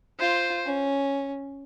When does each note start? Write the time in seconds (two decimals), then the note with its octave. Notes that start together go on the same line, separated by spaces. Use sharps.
0.20 F4 C5
0.65 C#4